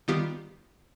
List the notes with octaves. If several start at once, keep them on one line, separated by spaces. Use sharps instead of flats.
D#3 G3 B3 F4 G4